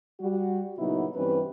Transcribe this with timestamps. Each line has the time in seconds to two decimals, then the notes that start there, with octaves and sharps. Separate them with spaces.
0.21 G3 F#4
0.78 A#2 C#3 F#3 B3 D#4 E4
1.15 G2 E3 G3 C4 C#4 B4